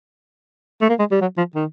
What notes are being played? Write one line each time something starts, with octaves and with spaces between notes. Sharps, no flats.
A3
A#3
G#3
G3
F#3
F3
D#3